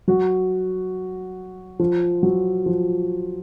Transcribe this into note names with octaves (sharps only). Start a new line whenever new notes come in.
F#3 F#4
F3 F4
F#3 F#4
F3 F4